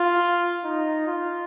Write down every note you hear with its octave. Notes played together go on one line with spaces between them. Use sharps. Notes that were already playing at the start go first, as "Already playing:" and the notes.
Already playing: F4
D#4
F4